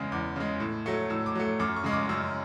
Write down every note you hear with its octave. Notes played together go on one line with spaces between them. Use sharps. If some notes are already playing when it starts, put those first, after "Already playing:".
Already playing: E2 C#3 G#3
E2 D6
C#3 G#3
A2
F#3 A3
A2 E6
D6
F#3 A3
F#2 D6
C#6
C#3 G#3
D6
F#2 E6